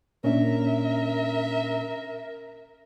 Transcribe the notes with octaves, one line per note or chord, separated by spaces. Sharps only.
A#2 C#4 D4 A#4 E5